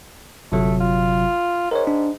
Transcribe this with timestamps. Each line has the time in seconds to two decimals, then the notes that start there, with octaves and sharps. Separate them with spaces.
0.52 G1 C3 F#3 A3
0.80 F4
1.71 G#2 A#4 C#5
1.87 D4